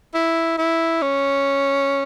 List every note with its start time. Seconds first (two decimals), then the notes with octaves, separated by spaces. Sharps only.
0.14 E4
0.58 E4
1.02 C#4